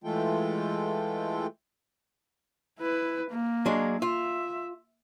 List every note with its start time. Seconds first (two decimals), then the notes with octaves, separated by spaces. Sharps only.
0.04 E3 G#3 A3 F4 A4 G5
2.79 E4 B4
3.30 A#3
3.66 F#3 G#3 D4
4.02 F4 E5